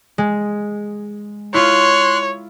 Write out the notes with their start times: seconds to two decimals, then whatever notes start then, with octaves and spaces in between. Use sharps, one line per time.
0.18 G#3
1.54 E4 F4 C#5 C6 F#6